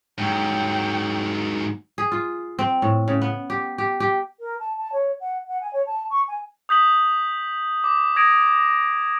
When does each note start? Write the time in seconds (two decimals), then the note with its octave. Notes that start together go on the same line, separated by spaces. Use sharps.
0.18 G#2 F#3 G5
1.98 G#4
2.12 F4
2.59 C4
2.82 A2
3.08 C#3
3.22 B3
3.50 G4
3.78 G4
4.00 G4
4.40 A#4
4.59 A5
4.77 A5
4.92 C#5
5.20 F#5
5.48 F#5
5.61 G#5
5.73 C#5
5.86 A5
6.10 C#6
6.28 G#5
6.69 D#6 G6 B6 F#7
7.84 D6
8.16 D#6 G#6 A#6 D7